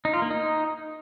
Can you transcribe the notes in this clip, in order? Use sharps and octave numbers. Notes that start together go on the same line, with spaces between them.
D#4
F4
A#3
D#4